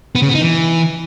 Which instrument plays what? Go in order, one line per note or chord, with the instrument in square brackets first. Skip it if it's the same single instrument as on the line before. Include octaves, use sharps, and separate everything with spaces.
[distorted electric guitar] B3
C#3
B3
D#4
E3